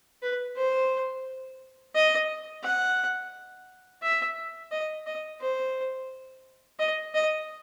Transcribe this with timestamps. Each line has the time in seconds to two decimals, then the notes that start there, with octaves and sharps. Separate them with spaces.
0.23 B4
0.56 C5
1.95 D#5
2.64 F#5
4.03 E5
4.72 D#5
5.06 D#5
5.40 C5
6.79 D#5
7.15 D#5